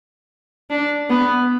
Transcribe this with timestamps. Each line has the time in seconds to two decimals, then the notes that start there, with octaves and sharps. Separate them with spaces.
0.70 D4
1.10 B3